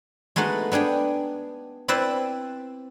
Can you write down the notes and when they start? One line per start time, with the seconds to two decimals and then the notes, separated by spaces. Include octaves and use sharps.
0.36 G#3 A3 B3 D#4 F#4
0.72 B3 D4 G#4 G5
1.88 C4 E4 B4 C5 D5 E5